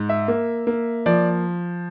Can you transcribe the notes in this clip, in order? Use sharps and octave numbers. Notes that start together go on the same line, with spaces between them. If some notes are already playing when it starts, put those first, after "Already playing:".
Already playing: G#2
E5
A#3
A#3
F3 D5